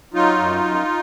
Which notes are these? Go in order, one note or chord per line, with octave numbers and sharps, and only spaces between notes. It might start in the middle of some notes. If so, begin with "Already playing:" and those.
F#3 D#4 F4
F#2
F#2